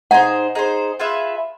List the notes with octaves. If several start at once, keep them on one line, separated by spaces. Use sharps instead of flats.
D#4 G#4 C5 F#5
D#4 G#4 C5
F4 G#4 B4 E5